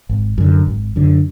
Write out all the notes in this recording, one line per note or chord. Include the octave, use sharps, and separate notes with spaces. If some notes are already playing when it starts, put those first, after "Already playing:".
G#1
F#2 D3
G#1
F#2 D3